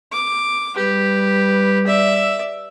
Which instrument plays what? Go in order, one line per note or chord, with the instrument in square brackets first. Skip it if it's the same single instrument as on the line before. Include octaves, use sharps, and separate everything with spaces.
[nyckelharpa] D6
[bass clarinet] G3 [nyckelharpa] G4 B4
[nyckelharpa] D5 E5